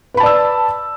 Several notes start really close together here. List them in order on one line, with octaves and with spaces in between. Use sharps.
B4 B5 A5 D5 E6